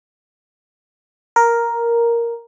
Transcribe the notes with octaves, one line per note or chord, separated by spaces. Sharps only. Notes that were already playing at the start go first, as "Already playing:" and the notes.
A#4